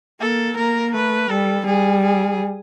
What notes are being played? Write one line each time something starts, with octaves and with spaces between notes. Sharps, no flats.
A#3 A4
A#3 A#4
A3 B4
G3 A4
G3 G#4
G#4